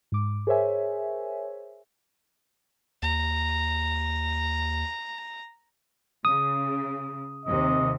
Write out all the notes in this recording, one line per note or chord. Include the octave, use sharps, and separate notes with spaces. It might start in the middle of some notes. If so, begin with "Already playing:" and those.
G#2 D6
G#4 A#4 C5 C#5 E5 G#5
D#2 A#5
C#3 D#6
D#2 C3 D#5